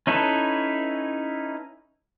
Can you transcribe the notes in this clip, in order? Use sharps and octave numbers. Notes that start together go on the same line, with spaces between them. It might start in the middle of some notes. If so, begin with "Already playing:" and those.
C#4 D#4 E4 A4 B4